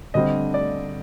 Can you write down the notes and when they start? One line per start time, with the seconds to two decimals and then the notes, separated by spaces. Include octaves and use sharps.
0.14 D3 G3 C4 D#5
0.54 D5